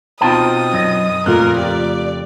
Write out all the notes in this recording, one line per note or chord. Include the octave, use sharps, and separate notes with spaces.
B2 C4 D#4 F4 G5 A5 D#6
F#2 D#5
F2 A#2 C#3 A3 F4 A#4 F#6
G4 D5